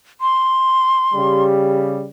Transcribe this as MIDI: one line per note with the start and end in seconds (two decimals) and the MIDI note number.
0.21 1.43 84
1.14 2.07 49
1.14 2.07 55
1.14 2.07 67